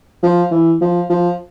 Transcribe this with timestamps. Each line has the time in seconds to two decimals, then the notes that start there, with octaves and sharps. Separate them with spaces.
0.23 F3
0.51 E3
0.81 F3
1.09 F3